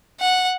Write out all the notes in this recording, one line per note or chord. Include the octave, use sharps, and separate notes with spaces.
F#5